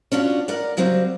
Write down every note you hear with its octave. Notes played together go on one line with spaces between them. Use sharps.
C#4 D4 F4 F#4
A#4 D5 F#5
C#3 F#3 G3 C4